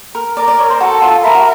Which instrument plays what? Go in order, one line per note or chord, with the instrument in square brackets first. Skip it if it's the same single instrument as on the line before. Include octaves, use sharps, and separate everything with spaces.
[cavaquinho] A#4
[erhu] A#4 [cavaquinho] D5
[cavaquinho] D5
C#5
C5
[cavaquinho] F#4 [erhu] A4
[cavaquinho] F4
[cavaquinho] E4 [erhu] A#4
[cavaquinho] F#4